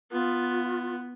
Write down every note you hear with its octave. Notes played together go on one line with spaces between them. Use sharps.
B3 F4